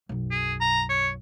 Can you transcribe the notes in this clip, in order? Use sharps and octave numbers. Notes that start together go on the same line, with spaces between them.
B1 F#2
G#4
A#5
C#5